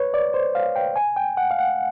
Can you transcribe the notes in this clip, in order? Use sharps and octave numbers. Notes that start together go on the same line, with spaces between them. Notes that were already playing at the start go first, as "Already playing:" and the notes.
Already playing: B4 C#5
D5
C5
F5
G5
G#5
G5
F#5
F5
F#5